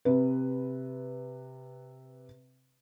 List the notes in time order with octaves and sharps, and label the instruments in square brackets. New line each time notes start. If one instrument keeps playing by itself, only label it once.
[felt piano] C3 B4